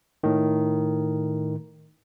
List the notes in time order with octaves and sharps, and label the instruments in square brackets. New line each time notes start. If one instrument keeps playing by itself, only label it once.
[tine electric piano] A2 D#3